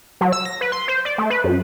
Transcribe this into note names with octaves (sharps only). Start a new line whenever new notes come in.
F#3
E6
A#6
B4
C6
C5
D5
A3
B4
F#2